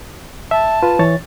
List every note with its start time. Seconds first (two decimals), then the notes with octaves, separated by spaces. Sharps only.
0.51 E5 A5
0.83 F4 B4
0.99 E3 C#5 A6